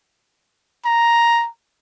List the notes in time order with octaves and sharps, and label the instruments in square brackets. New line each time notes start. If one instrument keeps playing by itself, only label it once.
[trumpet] A#5